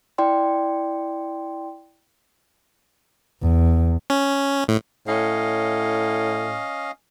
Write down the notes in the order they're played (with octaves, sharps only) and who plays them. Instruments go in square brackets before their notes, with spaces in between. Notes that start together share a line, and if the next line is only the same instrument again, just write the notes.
[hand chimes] E4 D5 G5 C6
[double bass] E2
[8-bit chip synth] C#4
A2
[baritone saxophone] A2 [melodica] C#4 D#5 F5